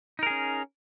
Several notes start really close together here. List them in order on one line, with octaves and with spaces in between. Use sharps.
D#4 A#4 G#4 C#4